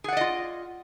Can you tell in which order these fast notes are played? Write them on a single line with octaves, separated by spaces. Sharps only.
G#4 F#5 D5 D#5 F4